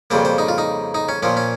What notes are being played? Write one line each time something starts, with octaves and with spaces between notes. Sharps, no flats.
F2 C#3 G3 A#3 C5
C5
D#4
F4
D#4
D#4
C#4
A#2 F3 A#3 C#4
C#4